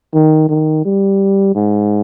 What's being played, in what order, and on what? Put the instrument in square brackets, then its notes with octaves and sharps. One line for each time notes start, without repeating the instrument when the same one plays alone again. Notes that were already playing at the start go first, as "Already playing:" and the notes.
[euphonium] D#3
D#3
G3
G#2